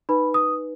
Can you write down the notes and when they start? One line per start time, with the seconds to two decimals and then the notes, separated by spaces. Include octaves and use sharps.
0.09 D#4 B4 B5
0.34 D#6